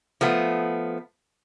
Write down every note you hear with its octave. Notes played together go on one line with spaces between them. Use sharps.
F3 A3 B3